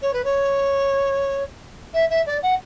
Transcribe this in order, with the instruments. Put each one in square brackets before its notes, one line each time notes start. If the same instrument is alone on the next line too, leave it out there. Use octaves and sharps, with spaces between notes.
[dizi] C#5
B4
C#5
E5
E5
D5
F#5